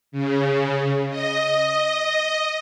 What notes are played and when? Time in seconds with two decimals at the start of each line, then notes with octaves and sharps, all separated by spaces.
0.12 C#3
1.10 D#5